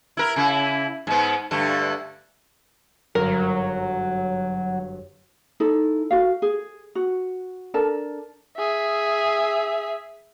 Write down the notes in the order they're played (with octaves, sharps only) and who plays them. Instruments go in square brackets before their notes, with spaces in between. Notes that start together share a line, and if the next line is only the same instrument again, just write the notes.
[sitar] E4 A#4
C#3 E4
G#2 B3
G2 D3 A3
[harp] G1 F#2 [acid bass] F#3 [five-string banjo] A#4
[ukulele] D#4 E4 A4
F#4 F5
G#4
F#4
D4 A4 A#4 A5
[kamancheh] G#4 E5